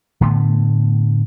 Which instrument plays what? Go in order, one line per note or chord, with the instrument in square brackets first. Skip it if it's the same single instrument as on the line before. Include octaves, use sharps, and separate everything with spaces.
[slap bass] A2 D3 A3 B3